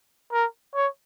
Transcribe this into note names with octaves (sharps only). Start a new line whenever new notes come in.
A#4
C#5